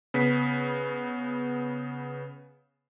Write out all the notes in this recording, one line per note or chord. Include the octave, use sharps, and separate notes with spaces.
C#3 B3 B6